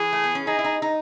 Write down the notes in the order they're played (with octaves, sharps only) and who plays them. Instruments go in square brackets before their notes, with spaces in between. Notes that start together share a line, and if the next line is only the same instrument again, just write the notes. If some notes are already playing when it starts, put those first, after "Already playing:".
Already playing: [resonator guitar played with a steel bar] E3 [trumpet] G#4
[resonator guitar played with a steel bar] A3
B3
C#4
[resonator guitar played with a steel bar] D#4 [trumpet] G#4
[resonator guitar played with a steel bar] E4
D#4
D#4